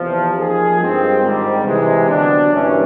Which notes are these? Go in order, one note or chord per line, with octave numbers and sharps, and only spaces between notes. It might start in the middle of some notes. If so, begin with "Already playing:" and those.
Already playing: E2 C3 F3
F3 A#3 D#4 G#4
G2 D#3 G#3 C4 F4
G#2 D#3 G3
C3 E3 G#3
D3 F#3 B3 D4
G2 E3 G3 A#3 C#4